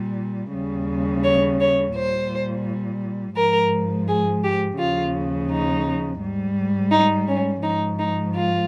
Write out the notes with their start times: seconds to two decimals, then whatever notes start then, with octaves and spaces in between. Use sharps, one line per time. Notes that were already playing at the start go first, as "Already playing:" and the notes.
Already playing: A#2 G3
0.53 D#2 C#3 G3
1.23 C#5
1.59 C#5
1.94 A#2 G3 C5
3.36 G#2 F3 A#4
4.07 G#4
4.43 G4
4.78 D#2 C#3 F3 F4
5.49 D#4
6.20 G#2 G3
6.91 D#4
7.27 C#4
7.62 G#2 F3 D#4
7.98 D#4
8.34 F4